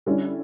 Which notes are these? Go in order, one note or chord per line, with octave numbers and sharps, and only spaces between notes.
D3 G3 C#4 E4